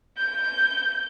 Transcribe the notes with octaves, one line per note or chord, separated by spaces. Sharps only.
G6